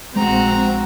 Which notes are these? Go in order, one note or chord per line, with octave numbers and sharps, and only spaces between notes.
A#1 G#3 C4 F#4 A#5